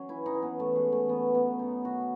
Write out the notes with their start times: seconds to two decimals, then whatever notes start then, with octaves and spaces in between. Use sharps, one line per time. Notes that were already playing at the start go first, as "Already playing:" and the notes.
Already playing: F#3 C#4
0.09 E3 E4
0.26 D#4
0.35 E3
0.42 B3
0.58 E3 A3
0.76 G#3
0.84 E3
0.92 A3
1.09 F#3 B3
1.34 F#3 B3
1.59 F#2 D#4
1.84 D#3 F#4